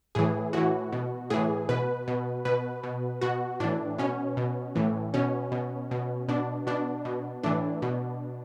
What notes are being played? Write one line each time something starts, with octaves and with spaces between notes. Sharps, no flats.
A2 E3 G#4
A2 E3 F#4
B2
A2 E3 G#4
B2 B4
B2
B2 B4
B2
B2 F#4
A2 E3 D4
B2 C#4
B2
A2 E3
B2 C#4
B2
B2
B2 D4
B2 D4
B2
A2 E3 D4
B2